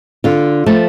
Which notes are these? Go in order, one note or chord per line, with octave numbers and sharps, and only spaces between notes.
D3 F4
F3 A3